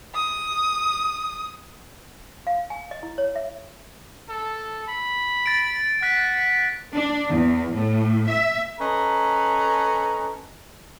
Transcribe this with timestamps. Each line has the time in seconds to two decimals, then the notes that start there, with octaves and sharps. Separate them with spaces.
0.15 D#6
2.47 F5
2.70 G#5
2.91 D#5
3.03 E4
3.18 C#5
3.35 E5
4.29 A4
4.88 B5
5.46 A6 D7
6.03 F#5 F#6 B6
6.94 D4
7.30 E2
7.76 A2
8.29 E5
8.80 C#4 A4 B4 D#5 A#5